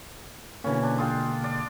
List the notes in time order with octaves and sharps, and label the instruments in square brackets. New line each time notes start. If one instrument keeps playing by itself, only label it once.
[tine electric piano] B2 D3 A#3 [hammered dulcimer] E3 C#4
[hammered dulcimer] D4
G#3 F4 G5
D5